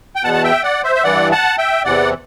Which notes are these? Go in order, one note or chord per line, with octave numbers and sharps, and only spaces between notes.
G5
E2 B2 F#5 A5
A5
E5 G5
D5 F#5
C5 E5
E5
G2 E3 D5 F#5
F#5 A5
E5 G5
E2 C3 E3 D5 F#5